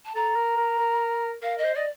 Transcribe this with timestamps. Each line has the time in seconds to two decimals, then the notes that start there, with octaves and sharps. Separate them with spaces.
0.05 A5
0.15 A4 A#5
0.36 A#4
0.57 A#4
0.78 A#4
1.42 A#4 F5
1.57 D#5
1.64 C5
1.74 D5 D#5